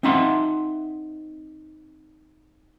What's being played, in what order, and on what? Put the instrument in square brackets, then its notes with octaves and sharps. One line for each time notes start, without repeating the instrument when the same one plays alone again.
[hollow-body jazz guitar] C4 D#4 E5 F#5 C6